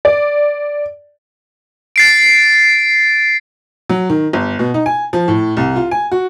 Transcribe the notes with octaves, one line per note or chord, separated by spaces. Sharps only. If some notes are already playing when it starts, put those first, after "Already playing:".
D5
A6 C7 D7
F#3
D#3
G1
B2
D#4
G#5
F3
A2
C2
F4
G#5
F#4